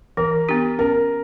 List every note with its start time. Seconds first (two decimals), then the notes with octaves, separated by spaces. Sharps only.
0.17 E3 A#4
0.49 B3 D4 G4
0.79 C#4 A#4